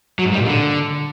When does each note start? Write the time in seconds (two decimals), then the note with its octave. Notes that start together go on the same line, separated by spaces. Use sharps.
0.19 F#3
0.26 G#2
0.33 G3
0.39 A#2
0.46 D3